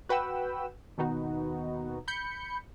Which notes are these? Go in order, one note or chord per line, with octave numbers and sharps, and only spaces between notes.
F#4 B4 F#5 G5 E6
D#2 B2 D#3 B3 D#4 F#4
B5 G6 C#7